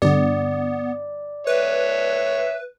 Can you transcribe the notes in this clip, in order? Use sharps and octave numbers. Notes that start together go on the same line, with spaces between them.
G2 D3 B3 D5
B4 C#5 E5